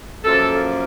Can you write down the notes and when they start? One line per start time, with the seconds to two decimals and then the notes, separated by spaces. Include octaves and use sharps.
0.24 F#2 F3 A#3 A4